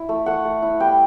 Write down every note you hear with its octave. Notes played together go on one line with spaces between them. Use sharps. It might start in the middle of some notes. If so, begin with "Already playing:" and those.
Already playing: E4
A3
A3 F#5
A3
E4
G3 G5